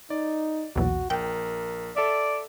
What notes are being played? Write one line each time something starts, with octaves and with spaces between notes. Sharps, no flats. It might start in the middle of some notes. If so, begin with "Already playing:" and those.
D#4 D5
B1 E2 A#2 F#4
A#1 A#4 G5
A4 D5 E5